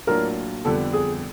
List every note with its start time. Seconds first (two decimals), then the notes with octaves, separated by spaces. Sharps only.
0.07 A2 F#3 A#3 D4 F4 A#4
0.65 F2 D3 G3 B3 A4
0.93 G#4